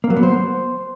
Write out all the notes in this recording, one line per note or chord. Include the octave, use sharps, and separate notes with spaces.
A#3
F#3
B3
C5